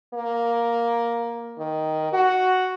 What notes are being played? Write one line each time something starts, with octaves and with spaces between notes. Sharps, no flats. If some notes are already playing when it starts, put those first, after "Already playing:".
A#3
D#3
F#4